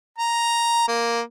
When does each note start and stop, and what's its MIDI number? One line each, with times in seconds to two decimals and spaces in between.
0.18 0.87 82
0.88 1.20 58